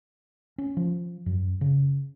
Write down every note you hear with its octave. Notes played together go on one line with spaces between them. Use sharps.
C#4
F3
F#2
C#3